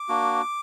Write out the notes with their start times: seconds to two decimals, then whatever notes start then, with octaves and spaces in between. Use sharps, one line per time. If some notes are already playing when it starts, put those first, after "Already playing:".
Already playing: D6
0.09 A#3 D4 F#4